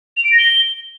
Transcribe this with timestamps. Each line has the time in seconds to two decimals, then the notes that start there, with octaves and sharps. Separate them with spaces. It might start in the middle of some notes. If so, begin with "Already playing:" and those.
0.17 F7
0.24 D7
0.31 A#6
0.39 G7